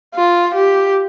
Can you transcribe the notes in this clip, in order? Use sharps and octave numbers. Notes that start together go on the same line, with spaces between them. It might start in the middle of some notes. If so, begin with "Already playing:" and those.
F4
G4